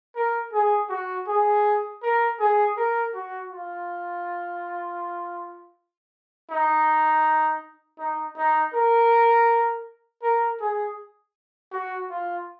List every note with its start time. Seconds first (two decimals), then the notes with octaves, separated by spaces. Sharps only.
0.16 A#4
0.53 G#4
0.89 F#4
1.28 G#4
2.02 A#4
2.40 G#4
2.77 A#4
3.14 F#4
3.51 F4
6.50 D#4
7.99 D#4
8.37 D#4
8.73 A#4
10.22 A#4
10.60 G#4
11.72 F#4
12.10 F4